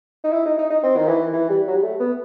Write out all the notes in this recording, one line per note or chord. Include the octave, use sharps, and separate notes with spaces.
D#4
E4
D#4
D#4
D#4
C4
D#3
E3
E3
G3
F#3
G3
A3
B3